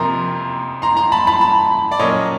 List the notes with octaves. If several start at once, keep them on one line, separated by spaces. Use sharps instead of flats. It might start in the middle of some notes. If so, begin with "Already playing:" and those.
Already playing: F2 C3 F3 A#3 A#5 C6
A#5 C6
A#5 C6
A5 B5
A5 B5
A5 B5
D5
A#2 F#3 A#3 C#4 C#5 D#5